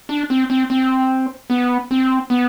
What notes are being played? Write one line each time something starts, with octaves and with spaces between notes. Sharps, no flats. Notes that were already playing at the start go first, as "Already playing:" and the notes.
D4
C4
C4
C4
B3
C4
B3